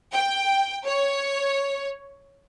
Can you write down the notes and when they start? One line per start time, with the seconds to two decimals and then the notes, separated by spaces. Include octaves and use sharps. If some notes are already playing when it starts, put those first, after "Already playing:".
0.14 G5
0.86 C#5